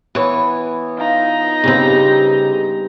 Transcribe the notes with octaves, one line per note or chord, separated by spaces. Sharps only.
E3 B3 C#5
D#4 F4 A#5
G2 C#3 C4 G4 G#5